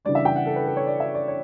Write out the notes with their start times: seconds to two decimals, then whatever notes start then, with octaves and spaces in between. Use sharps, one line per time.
0.05 C#3 E3 G3 D4 D5
0.15 E5
0.25 G5
0.36 F#5
0.46 A4
0.56 B4
0.66 A4
0.77 C#5
0.87 D5
1.00 E5
1.14 D5
1.28 C#5